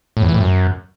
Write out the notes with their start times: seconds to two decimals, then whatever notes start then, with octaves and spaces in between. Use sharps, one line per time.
0.17 A2
0.23 E2
0.28 E3
0.34 A2
0.40 F#2